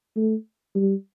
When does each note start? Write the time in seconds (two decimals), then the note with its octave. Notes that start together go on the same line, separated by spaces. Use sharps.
0.16 A3
0.75 G3